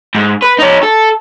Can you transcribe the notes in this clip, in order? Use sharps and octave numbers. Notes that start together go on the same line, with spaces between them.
G#2
B4
D#4 C#5
A4